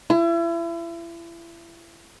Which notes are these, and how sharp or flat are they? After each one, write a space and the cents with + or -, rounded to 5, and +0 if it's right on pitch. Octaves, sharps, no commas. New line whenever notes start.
E4 +35